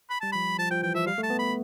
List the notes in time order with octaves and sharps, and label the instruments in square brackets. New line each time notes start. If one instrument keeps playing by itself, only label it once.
[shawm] B5
[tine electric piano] G3 [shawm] A5
[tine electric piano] F3 [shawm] B5
[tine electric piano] F3 [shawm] A5
[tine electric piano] F3 [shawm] G5
[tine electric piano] E3 [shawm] G5
[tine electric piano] F3 [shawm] E5
[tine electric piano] G3 [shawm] F5
[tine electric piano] A3
[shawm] A5
[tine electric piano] B3
[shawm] B5